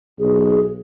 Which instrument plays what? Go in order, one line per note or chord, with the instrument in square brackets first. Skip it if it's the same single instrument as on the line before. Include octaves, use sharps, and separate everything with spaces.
[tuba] B1 [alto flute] G#4